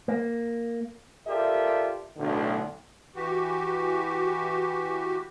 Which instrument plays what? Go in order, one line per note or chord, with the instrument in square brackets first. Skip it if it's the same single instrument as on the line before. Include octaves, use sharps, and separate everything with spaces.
[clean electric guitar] A#3
[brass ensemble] F4 G4 A4 A#4 D5 E5
B1 A2 D3
[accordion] E3 F#4 G4